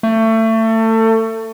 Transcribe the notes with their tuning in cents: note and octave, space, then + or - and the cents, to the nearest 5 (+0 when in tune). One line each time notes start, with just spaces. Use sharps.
A3 +25